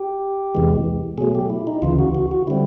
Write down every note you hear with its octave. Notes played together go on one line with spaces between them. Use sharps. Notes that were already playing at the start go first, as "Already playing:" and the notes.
Already playing: G4
E2 C3 E3 G#3
B2 F#3 A3 G#4
G4
E4
D#4
D2 C#3 E3 F4
F#4
F#4
F#4
D3 G3 C4 E4